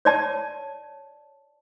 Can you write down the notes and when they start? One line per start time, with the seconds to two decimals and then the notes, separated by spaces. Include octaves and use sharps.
0.05 C#5 D5 A5